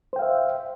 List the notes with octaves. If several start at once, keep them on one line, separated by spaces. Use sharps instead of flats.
C5 E5 F5 G5